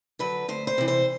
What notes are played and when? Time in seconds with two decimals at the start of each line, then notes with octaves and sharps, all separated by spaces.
0.19 D3 F#3 B4
0.48 D2 C5
0.67 C5
0.78 C3 E3
0.88 C5